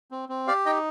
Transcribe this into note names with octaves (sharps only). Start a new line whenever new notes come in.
C4
C4
G4 D5 F5
D#4 D#5 G5